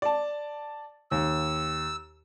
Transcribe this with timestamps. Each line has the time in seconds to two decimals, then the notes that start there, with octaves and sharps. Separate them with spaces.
0.02 D5 A5
1.11 D#2 E6